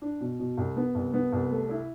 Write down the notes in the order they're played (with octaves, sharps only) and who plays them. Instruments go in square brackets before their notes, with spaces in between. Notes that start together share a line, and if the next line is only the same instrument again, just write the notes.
[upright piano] D4
B2
B2
C2
B3
C2
B3
C2
A3
E4